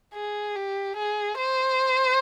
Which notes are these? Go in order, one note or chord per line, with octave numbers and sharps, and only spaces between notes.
G#4
G4
G#4
C5